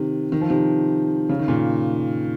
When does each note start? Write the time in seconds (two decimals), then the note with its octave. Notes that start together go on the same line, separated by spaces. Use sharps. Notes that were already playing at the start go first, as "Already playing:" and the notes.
Already playing: C3 D#3
0.32 D#3
0.41 F3
0.50 C3 D#3
1.29 C#3
1.39 D#3
1.48 A#2 C#3